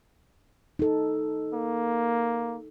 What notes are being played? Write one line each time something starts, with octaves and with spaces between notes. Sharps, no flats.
D#4 A4
A#3